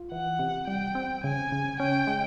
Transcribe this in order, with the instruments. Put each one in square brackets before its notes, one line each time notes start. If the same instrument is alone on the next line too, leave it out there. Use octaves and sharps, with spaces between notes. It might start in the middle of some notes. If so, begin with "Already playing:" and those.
Already playing: [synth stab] F4
[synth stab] E3 [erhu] F#5
[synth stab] C3
[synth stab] G3 [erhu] G5
[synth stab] C4
[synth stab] C#3 [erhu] G#5
[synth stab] C#3
[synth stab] C#4 [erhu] G5
[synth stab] G#3